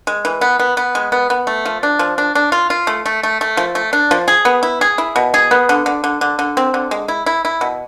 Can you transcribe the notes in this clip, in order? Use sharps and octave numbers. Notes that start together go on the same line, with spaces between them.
G#3
E3
B3
B3
B3
G#3
B3
B3
A3
F3
D4
F3
D4
D4
F4
F4
A3
A3
A3
A3
F3
A3
D4
F3
G#4
B3
E4
G#4
E4
B2
G#4
B3
D3
D3
D3
D3
D3
C4
D3
G#3
E4
E4
E4
B2